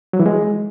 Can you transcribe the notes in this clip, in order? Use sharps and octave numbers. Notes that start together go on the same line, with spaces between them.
F#3
E3
G#3